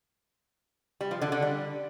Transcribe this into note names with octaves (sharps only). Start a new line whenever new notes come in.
G3
F3
D3
D3
G3